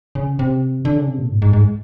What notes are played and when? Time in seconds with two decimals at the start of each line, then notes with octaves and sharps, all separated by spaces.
0.15 C#3
0.39 C3
0.85 D3
0.96 C#3
1.07 C3
1.18 A#2
1.30 G#2
1.42 G#2
1.53 G#2